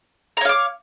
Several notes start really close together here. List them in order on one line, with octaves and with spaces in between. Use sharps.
A#5 C#5 F5 D6